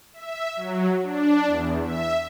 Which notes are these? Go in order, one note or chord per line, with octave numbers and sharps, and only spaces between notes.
E5
F#3
D4
E2
E5